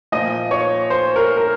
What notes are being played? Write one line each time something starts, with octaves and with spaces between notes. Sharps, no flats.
A#2 F3 D#5
C#5
C5
A#4
A#4